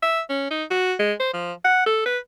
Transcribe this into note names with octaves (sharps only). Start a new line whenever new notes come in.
E5
C#4
D#4
F#4
G#3
C5
F3
F#5
A4
B4